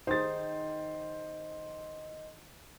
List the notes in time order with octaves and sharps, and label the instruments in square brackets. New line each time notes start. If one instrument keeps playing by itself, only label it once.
[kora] D#3 G#4 [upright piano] C5 A6 [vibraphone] D#5